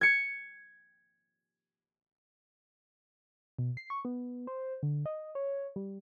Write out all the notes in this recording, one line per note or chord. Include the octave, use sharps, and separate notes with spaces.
G#6 C#7
B2
C7
C#6
B3
C5
D3
D#5
C#5
G3